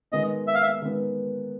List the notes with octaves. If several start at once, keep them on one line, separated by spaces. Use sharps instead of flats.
D#3 G#3 B3 D#5
E5
F5
E5
D#3 G#3 B3